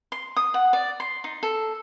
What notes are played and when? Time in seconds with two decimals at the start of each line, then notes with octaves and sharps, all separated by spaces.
0.12 C6
0.36 D#6
0.54 F#5
0.73 D5
1.00 C6
1.24 D#4
1.43 A4